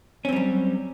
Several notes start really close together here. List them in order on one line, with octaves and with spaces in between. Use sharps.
C#4 C4 G3 F#3